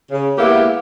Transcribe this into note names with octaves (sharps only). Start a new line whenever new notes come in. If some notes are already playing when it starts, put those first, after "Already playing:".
C#3
G#3 A#3 B3 E4 G4